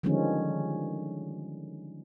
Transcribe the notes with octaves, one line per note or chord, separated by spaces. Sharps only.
D3 D#3 F3 G3 G#3 C#4